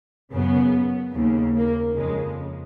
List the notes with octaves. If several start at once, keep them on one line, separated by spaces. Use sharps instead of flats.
F#2 C#3 B3
D#2 C#3
A#3
F2 C#3 G#3